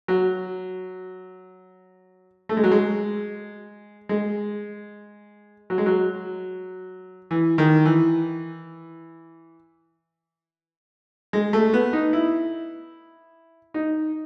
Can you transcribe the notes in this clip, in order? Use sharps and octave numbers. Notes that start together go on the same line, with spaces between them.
F#3
A3
G#3
F#3
G#3
G#3
F#3
G#3
F#3
E3
D#3
E3
G#3
A3
B3
D#4
E4
D#4